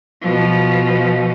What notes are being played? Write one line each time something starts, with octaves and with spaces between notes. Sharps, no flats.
B2 F3